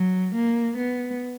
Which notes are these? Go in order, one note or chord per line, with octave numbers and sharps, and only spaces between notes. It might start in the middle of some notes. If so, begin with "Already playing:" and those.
Already playing: F#3
A#3
B3